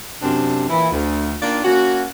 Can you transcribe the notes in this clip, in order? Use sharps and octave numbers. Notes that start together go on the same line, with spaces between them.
F#2 C3 C4 D4
A#2 E3 E4
D2
D#3 A#3 D4 F4 D5
A#3 C#4 F#4